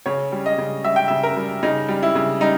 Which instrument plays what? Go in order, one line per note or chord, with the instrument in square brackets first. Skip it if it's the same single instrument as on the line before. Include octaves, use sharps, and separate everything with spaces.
[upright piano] C#3 C#5
G3
D#5
C#3
G3 E5
G5
C#3 E5
A#4
G3
C#3 D#4
G3
E4
C#3
G3 D#4